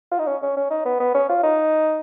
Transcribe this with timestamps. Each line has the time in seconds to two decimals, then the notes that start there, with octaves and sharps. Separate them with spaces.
0.11 F4
0.19 D#4
0.27 C#4
0.42 C#4
0.56 C#4
0.70 D#4
0.85 B3
1.00 B3
1.14 C#4
1.29 F4
1.43 D#4